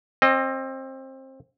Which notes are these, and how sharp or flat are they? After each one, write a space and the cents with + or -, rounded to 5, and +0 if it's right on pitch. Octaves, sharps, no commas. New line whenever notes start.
C4 +25 D#5 -15